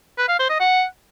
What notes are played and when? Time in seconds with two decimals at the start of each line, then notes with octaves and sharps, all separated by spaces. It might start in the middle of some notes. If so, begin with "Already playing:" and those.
0.18 B4
0.29 F5
0.39 C5
0.50 D#5
0.60 F#5